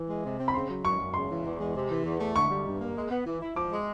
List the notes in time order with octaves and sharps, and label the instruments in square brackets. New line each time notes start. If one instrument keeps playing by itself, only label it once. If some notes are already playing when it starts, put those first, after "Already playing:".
Already playing: [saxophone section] E3
G#3
C3
C4
[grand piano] B5
[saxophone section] C#3 [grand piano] C6
[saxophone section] F#3
[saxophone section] F#2 [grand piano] C#6
[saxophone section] F#2
[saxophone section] C#3 [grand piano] C6
[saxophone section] E3
E2
G#3
C3
E3
E2
A3
[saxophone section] D3 [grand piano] C#6
[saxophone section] G3
G2
A#3
G#3
B3
E3
E4
[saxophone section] F3 [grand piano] D6
[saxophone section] G#3